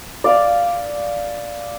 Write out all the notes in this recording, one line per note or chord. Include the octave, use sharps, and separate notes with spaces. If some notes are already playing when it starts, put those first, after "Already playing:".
D5 F5